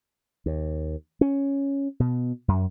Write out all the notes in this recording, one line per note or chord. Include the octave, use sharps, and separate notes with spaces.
D#2
C#4
B2
F#2